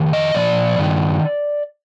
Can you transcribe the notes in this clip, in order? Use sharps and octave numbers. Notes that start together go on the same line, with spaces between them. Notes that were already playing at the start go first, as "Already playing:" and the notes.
Already playing: F2 D#3
D#5
A#2 F3 D5
G2 D#3